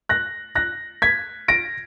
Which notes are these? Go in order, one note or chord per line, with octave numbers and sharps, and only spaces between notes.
F#6 A#6
F#6 A#6
G#6 B6
A#6 D7